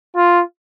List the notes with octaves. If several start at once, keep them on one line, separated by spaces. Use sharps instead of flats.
F4